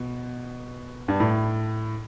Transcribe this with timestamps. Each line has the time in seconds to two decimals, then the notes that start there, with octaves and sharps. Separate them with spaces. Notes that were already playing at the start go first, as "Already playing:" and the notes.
Already playing: B2
1.08 G2
1.20 A2